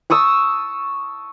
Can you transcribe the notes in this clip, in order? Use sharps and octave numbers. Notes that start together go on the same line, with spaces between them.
A5 C#6 D#6 E6